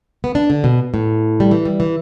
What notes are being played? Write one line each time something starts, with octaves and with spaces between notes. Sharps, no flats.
B3
D4
D3
B2
A2
G3
E3
G3
E3